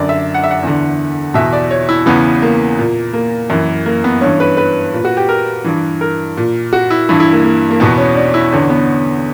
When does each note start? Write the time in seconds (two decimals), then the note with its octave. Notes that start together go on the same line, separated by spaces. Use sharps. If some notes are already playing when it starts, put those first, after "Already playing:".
Already playing: F#2 D3 D5
0.09 E5
0.34 F#5
0.44 E5
0.51 F#5
0.62 E2 D3
1.34 E2 B2 E5
1.53 D5
1.71 C#5
1.89 E4
2.06 E2 C#3 E3 B3
2.42 A#3
2.79 A#2
3.13 A#3
3.50 F#2 E3
3.86 A#3
4.04 B3
4.21 G2 E3 C#4
4.40 B4
4.57 B4
4.93 A#2
5.05 F#4
5.17 G4
5.29 A#4
5.64 G2 E3
6.01 A#4
6.37 A#2
6.73 F#4
6.90 E4
7.09 G2 E3 E4
7.20 E4
7.33 A#3
7.44 A#3
7.71 A#3
7.80 E2 B2 B3
7.98 C#4
8.15 D4
8.34 E4
8.52 E2 D3 C#4
8.70 B3